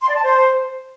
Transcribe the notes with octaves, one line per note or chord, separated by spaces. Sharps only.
C6
D5
A5
C5